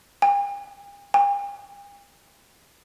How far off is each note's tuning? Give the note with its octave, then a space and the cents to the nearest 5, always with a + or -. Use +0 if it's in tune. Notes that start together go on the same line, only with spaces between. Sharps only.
G5 +45
G5 +45